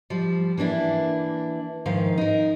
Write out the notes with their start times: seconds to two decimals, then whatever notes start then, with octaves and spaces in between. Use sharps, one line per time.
0.10 F3 G3
0.58 E3 A#3 D4 E4
1.86 G#2 D#3 F3 F5
2.18 D#4 A#4